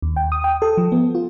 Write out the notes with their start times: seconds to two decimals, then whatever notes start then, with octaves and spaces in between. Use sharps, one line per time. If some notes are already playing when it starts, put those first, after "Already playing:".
0.02 D#2
0.16 G5
0.32 D#6
0.44 G5
0.62 A4
0.77 F3
0.92 B3
1.15 F4